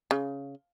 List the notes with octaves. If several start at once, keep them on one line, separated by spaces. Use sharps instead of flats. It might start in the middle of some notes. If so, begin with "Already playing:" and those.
C#3